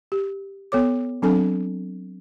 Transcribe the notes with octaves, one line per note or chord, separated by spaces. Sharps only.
G4
B3 A4 C#5 D6
F#3 C4 D4 A4 G#5